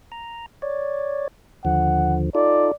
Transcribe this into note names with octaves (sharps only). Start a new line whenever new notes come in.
A#5
C#5 D5
D#2 D3 F3 F#5
D#4 F4 A4 D5